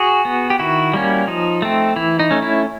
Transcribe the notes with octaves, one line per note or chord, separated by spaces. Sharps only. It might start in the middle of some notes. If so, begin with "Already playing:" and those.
Already playing: F#4 G#4
B3
G4
D#3 E4 F#4
G3 A#3 C#4
F3 D#4
A3 C4
E3 E4
D#4
A3 C#4
E4